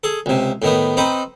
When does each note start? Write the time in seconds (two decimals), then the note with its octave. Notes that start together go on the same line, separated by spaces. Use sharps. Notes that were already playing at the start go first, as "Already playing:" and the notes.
0.04 G#4 A4
0.26 C#2 C3
0.62 A2 D#3 B3
0.97 C4 D#4 B4